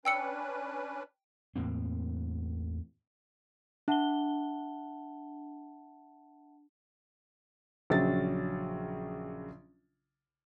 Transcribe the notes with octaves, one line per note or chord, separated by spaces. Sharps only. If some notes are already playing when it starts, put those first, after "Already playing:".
C#4 D4 B4 G5 E6 C#7
E2 A2 A#3 C4
D4 E5 F#5 A5 G7
A#1 C#3 F#3 A6